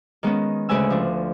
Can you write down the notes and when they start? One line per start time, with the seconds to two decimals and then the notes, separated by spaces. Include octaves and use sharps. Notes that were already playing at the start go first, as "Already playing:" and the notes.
0.23 D#3 G#3 B3 C#4
0.69 D2 C#3 G#3 B4 G#5 E6
0.90 F3 D4